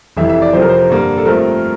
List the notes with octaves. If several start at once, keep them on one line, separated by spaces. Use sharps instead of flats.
F1 F2 E3 E5
E5
D5
F2 C3 F3 C5
A#4
C5
G2 D3 G3 A#3
A4
G2 F3 A3 C4 A#4